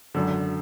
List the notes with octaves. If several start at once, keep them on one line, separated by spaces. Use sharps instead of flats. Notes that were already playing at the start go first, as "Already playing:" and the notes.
G#1 F#2 D3